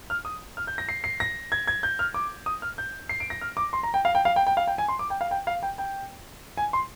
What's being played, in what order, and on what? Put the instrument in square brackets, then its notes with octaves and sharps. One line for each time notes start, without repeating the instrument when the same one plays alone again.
[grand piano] F6
D#6
F6
G6
A#6
C7
C7
A#6
G#6
G#6
G6
F6
D6
D#6
F6
G6
C7
D7
A#6
F6
D6
C6
A#5
G5
F5
G5
F5
G5
G5
F5
G5
G#5
C6
D6
G5
F5
G5
F5
G5
G5
G#5
C6